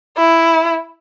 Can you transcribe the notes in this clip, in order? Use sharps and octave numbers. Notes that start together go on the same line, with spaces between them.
E4